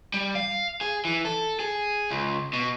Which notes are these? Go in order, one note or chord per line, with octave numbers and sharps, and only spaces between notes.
G3
F5
G#4
E3
A4
G#4
C#2
B2